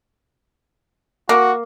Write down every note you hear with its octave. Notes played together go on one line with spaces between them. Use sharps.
A#3 F#4